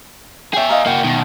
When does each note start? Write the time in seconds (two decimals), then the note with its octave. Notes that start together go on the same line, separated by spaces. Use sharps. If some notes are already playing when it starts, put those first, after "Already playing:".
0.53 G#4 C#5 E5 G5
0.69 D#5 F5 A#5
0.86 A#3 E4 F#4 G5
1.04 B2 D#3